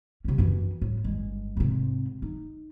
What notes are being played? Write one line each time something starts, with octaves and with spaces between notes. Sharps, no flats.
C3 C#4
F#2 E3
A2
G1 G#3
G#2 C3
D#4